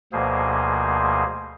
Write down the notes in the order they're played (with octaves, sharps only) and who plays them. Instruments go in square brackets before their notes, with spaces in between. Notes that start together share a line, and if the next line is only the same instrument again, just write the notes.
[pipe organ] D2 B2 F3 A#3 G#4 C5